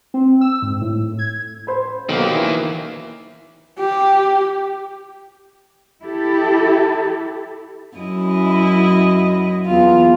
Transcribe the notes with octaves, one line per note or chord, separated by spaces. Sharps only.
C4
E6
G#2
A2
G#6
C5 B5
B1 D#3 A#3
E3
G4
E4 G4 A4
F#2 E4 D#5
E2 F4